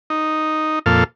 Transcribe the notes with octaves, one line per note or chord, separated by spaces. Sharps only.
D#4
F2 A#2 A4 F5